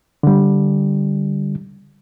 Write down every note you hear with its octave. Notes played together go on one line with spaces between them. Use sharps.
D3 G3